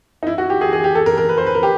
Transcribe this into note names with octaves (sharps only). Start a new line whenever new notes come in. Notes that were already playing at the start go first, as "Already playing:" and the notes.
D#4
E4
F#4
G4
G#4
G#4
G4
A4
A#4
A#4
B4
C5
B4
A#4
G4